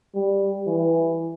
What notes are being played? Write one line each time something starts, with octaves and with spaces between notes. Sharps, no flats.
G3
E3